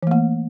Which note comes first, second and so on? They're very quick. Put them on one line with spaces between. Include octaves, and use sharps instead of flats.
E3 A3 A#3